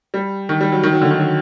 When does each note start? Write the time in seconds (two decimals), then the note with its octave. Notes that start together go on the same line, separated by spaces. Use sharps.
0.14 G3
0.49 D#3
0.61 G3
0.72 F#3
0.83 D#3
0.93 F#3
1.01 D3
1.11 D#3
1.19 F#3